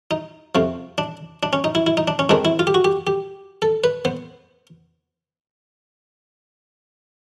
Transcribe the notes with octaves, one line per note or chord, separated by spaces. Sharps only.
D#4
F2 C3 F3
D4
D4
C#4
D#4
E4
E4
D#4
D4
C#4
G#2 D#3 G#3 C4 D4
E4
F4
G4
F#4
G4
G4
A4
B4
B3 C5